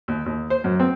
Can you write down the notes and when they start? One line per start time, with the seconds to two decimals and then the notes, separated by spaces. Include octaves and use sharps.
0.08 D#2
0.26 D#2
0.50 C5
0.64 F#2
0.80 C4